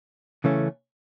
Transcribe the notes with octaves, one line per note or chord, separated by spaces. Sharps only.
C#3 E3 A3 C#4